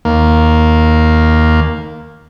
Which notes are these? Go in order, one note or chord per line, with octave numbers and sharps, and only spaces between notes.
D#2 A#3